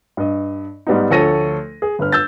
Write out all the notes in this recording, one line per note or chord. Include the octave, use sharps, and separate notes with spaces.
G2 D#5
G#2 G3 B3 D#4
D2 F3 A4 C#5 A#6 D#7
G#4
G1 B4 F6
E6 G6 A6